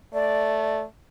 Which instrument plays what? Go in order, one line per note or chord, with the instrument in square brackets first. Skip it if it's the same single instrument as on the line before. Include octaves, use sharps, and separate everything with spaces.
[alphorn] A3 [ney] D5